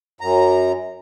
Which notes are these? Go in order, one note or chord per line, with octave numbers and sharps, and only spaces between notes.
F#2 A#5